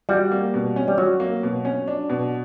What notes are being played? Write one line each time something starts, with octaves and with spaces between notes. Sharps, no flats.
G3 F#4
A#3
B2
C#4
G3
F#3 F#4
A#3
B2
C#4
D4
B2